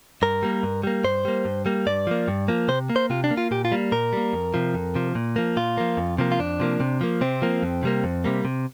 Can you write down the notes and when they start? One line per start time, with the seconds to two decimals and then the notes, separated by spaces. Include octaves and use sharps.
0.22 G2 A#4
0.43 G3 A#3
0.63 G2
0.83 G3 A#3
1.04 G2 C5
1.25 G3 A#3
1.45 G2
1.66 G3 A#3
1.86 G2 D5
2.07 F3 A#3
2.28 G2
2.48 F3 A#3
2.68 C3 C5
2.89 A#3
2.96 C5
3.10 C3 F4
3.24 D4
3.31 A#3
3.37 F4
3.51 A#2 G4
3.65 F4
3.72 G3 A#3
3.92 A#2 A#4
4.13 G3 A#3
4.33 F2
4.54 C3 F3
4.74 F2
4.95 C3 F3
5.15 A#2
5.36 F3 A#3
5.57 A#2 F4
5.78 F3 A#3
5.97 F2
6.18 C3 F3 A#3
6.32 F4
6.40 F2 D4
6.60 C3 F3 A#3
6.80 C3
7.01 F3 A#3
7.21 C3 C4
7.42 F3 A#3
7.63 F2
7.83 C3 G3 A#3
8.04 F2
8.24 C3 G3 A#3
8.45 C3